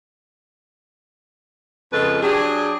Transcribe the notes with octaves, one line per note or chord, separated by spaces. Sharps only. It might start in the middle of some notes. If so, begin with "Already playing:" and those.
F2 C#3 G#3 F4 A4 B4
F#3 D4 G4 G#4